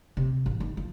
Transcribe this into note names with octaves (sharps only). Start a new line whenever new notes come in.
C3
A1
D#3
F3